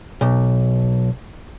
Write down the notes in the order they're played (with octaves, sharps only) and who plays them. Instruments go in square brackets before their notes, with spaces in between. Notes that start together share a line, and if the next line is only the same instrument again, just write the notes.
[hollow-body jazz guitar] B1